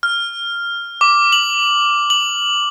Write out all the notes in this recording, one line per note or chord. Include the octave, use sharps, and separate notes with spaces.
F6
D6
F#7
F#7